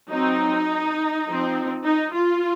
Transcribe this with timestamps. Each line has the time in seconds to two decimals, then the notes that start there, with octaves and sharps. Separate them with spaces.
0.11 F#3 C4 D#4
1.27 F3 C4
1.85 D#4
2.14 F4